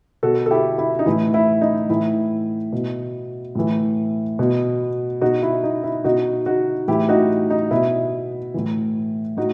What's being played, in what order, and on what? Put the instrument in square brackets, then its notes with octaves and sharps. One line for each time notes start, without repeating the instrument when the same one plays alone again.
[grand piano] B2 F#4 A4
A4
E4 G4
E4
D#4
A2 E3 E4
E4
D#4
A2 E3 E4
B2
A2 E3
B2
B2 D#4 F#4
E4
D#4
E4
B2 D#4 F#4
D#4 F#4
A2 E3 E4 G4
D#4 F#4
D#4
B2 E4
A2 E3
A2 D#4 F#4